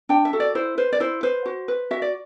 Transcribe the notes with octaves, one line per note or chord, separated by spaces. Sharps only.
D4 G5
E5
F#4 A4
D5
E4 C5
B4 C5
D5
E4 C5
B4 C5
F#4
B4
F#4 E5
D5